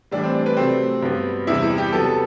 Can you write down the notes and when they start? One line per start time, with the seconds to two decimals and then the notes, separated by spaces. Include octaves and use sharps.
0.11 A2 E3 G3 D4
0.24 C4
0.35 D4
0.46 B4
0.57 C3 F#3 A3 C4
1.02 G2 F#3 B3
1.47 E2 C3 G3 E4
1.63 E4
1.78 G4
1.93 C3 F#3 B3 A4
2.04 A4